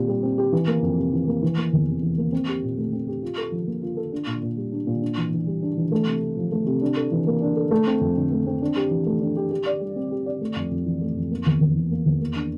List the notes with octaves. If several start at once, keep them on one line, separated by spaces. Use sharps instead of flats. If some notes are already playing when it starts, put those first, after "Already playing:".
Already playing: A#2 C4 G4
G3
C4
G4
E3
A#3
F2
C3
E3
A#3
E3
A#3
E2
C3
E3
A#3
C4
G4
A#2
A3
C4
G4
F4
A4
F3
A#3
F4
A4
D4
A#2
A#2
G3
D4
A#2
D4
E3
E3
G3
D4
E3
A3
C3
C3
F3
A3
C3
D4
A4
E3
A#3
D4
A4
A3
C4
F2
D3
A3
C4
D4
G4
E3
A3
D4
G4
G4
D5
G3
C4
G4
D5
A3
F2
F2
E3
A3
F2
A#3
E2
E2
E3
A#3
E2
A#3
D4